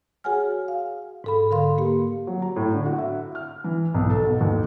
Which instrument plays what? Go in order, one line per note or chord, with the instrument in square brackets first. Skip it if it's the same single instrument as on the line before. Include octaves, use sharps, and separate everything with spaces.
[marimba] F#4 G#4 C#5 F#5 G#5 F6
F5
G#2 A4 B5
D3 A#4 F5 C6
A#3 G4
[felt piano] F#3
A#5
A2
D3
F#4
E5
F6
E3
B1
A4
B2
D#2